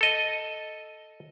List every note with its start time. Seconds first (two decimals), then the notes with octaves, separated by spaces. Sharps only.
0.01 A4 D#5